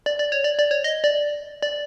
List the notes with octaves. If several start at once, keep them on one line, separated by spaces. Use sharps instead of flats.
D5
D5
C#5
D5
D5
C#5
D#5
D5
D5